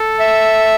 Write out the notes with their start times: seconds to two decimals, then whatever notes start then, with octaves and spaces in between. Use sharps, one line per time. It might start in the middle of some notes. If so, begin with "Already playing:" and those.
Already playing: A4
0.20 E5